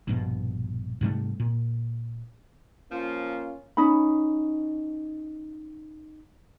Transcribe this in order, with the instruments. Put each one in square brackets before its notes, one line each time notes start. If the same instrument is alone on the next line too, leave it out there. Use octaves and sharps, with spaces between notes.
[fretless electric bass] A#1 G2 B2
G#2 C3 G3 A3
A#2
[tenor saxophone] F3 [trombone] A#3 [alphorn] C#4 [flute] F4
[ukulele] C#4 D#4 B5